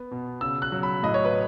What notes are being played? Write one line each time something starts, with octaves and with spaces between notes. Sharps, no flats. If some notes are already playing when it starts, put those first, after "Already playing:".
Already playing: B3
B2
C#3 E6
F#6
F#3
B5
A2 D#5
C#5
B4